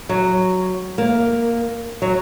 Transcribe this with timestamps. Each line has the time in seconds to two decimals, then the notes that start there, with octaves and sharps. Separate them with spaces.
0.09 F#3
0.98 A#3
2.02 F#3